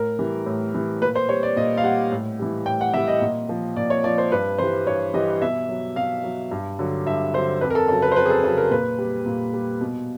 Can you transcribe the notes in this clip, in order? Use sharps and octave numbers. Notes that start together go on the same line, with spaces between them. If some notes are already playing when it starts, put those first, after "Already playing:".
Already playing: A2 A#4
E3 G3
A2
E3 G3
A#2 B4
C5
G3 C#5
D5
A#2 D#5
F5
G3 F#5
A2
E3 G3
A2 G5
F#5
E3 G3 E5
D#5
A#2
F3
A#2 D5
C#5
F3 D5
C5
G2 B4
E3 G3 C5
G2 C#5
E3 G3 D#5
B2 E5
F#3
B2 F5
F#3
G2
D3 F#3
G2 E5
D3 F#3 C5
F2 B4
A#4
A4
C#3 F#3 A4
B4
C5
F2 B4
G#4
A4
C#3 F#3 A4
A#4
A#2 B4
G3
A#2
G3
B2